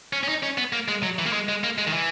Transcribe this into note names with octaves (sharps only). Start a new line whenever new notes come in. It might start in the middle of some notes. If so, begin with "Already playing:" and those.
C#4
C#4
D#4
C#4
B3
A#3
G#3
F#3
E3
A#3
G#3
G#3
A#3
G#3
D#3
E3